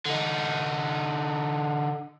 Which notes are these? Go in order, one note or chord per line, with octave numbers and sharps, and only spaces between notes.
D3 D#4